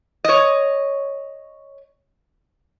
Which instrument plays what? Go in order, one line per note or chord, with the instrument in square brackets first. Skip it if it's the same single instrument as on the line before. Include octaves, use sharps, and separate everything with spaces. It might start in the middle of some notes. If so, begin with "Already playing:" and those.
[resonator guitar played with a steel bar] C#5 D#5